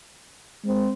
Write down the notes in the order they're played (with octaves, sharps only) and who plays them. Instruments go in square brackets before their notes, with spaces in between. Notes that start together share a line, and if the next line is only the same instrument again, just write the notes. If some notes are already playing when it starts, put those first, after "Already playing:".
[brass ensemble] G#3 C4